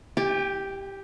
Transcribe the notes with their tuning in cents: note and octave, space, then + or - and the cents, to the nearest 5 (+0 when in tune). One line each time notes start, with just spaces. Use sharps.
G4 +0 G5 +45